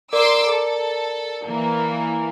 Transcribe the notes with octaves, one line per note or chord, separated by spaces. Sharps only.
A#4 D5 C6 D6 E6
A4
E3 A#3